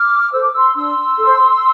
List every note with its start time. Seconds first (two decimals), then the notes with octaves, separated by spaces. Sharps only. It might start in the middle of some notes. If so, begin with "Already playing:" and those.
Already playing: D6 F6
0.32 A4 C5 E6
0.43 D6
0.54 C6 E6
0.75 D4 C6 E6
1.18 A4 C5